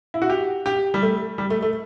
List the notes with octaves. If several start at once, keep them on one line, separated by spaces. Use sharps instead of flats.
E4
F#4
G4
G4
G3
A3
G3
A3
A3